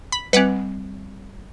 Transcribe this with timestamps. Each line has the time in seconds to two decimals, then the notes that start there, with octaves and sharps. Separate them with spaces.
0.12 B5
0.33 G3 C4 B4 F#5 D6